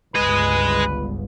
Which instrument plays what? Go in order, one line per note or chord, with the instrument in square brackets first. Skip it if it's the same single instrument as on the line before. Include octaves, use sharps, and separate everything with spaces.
[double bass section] G1 C#2 [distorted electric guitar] G#4 D#5 [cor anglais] B4